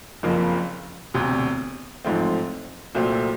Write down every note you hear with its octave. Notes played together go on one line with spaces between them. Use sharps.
F#1 F2 C#3 F3 A#3
E1 D2 C3
A1 G#2 F3 A3 C4
C2 A#2 F#3 A3 C4